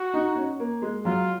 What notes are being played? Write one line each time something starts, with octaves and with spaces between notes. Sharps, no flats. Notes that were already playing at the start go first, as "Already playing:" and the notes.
Already playing: F#4
D#4
C#4
A#3
G#3
F#3 F4